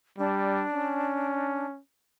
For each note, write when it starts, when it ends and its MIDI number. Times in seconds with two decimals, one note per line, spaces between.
0.19 0.65 55
0.19 1.66 62
0.73 1.80 61